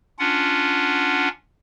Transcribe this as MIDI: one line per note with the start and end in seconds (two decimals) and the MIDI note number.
0.19 1.28 61
0.19 1.28 62
0.19 1.28 65
0.19 1.28 78